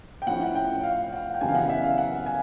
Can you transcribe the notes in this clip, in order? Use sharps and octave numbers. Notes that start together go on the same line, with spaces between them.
G5
A2 F3 A3 C#4 E4 F#5
G5
F5
F#5
G5
F#2 C#3 E3 G3 B3 G#5
F5
F#5
E5
F5
F#5
G#5